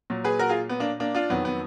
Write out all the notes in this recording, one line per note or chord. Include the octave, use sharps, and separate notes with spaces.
A#2 F#3
G#4 B4
F#4 A#4
F4 G#4
B3
A#3 D4
A#3 D4
D4 F4
F2 D#3 F#3 B3
B3